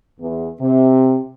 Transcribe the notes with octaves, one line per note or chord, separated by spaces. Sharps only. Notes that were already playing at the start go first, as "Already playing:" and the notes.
E2
C3